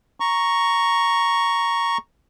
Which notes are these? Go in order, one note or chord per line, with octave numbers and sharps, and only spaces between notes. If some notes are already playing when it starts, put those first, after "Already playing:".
A#5 C#6